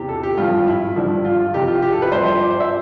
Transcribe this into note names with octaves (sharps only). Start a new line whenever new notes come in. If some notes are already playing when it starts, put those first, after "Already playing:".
Already playing: E2 C3 E3 G4
A4
G4
G2 F3 F4
F4
E4
G2 D3 F3
F4
F4
F2 C3 E3 G4
F4
G4
A4
B4
G2 F3 C5
C5
D5
C5
E5